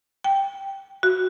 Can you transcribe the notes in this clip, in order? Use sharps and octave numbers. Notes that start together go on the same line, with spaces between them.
G5
F#4